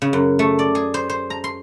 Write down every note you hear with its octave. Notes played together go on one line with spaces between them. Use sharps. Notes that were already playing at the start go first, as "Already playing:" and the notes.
C#3
F#2
A3
D5
G#4
C5
C5
A#5
C6